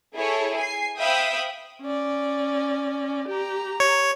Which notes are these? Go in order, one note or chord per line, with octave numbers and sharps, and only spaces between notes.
E4 G#4 A4 C#5
G#5 C7
C5 E5 F5 G5 B5 D#6
C#4 D5
G4 A#5
C#5